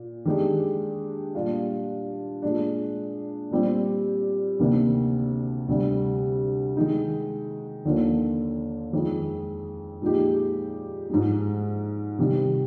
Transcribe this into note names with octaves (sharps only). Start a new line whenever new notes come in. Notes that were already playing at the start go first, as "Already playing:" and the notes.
Already playing: A#2
D#3 G#3 D4 G4
A#2 G3 D4 F4
A#2 G#3 D4
A#2 G3 C4 G4
D2 C3 D#3 A#3 D4
D2 C3 G3
D#3 G#3 D#4
D#2 D3 F3 A#3
F2 D#3 G#3
A#2 F3 G#3 D#4 G4
G#2 F3 G#3
C3 D#3 G3